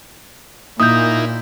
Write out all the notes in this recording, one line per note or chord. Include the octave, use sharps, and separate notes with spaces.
A#2 A#3 D#4 E4 D#6 G6